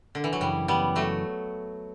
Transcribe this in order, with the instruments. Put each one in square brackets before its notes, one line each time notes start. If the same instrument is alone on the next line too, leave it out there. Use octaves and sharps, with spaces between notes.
[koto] D3
E3
F#3
[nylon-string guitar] F#2 C#3 E3 [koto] G3
[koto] G3 B3
F#3 A3